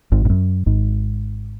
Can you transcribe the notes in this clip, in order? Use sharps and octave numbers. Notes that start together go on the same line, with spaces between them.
G#1 G#2
G#2
F#2
G#1 G#2